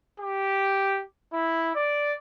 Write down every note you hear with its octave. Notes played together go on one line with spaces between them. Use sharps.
G4
E4
D5